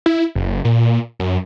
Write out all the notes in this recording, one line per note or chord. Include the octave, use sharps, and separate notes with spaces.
E4
F#1
A#2
F#2